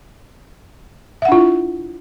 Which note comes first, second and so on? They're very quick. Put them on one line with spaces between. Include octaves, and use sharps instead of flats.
E5 F#5 D4 F4 E4